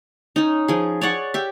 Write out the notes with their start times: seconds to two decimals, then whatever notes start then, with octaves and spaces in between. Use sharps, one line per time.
0.36 C#4 D#4
0.68 F3 G#4
1.01 C#5 D5 F#5 C#6
1.34 G4 E5